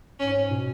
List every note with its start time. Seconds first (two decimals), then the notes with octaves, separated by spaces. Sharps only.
0.19 G#2 C#4
0.50 B2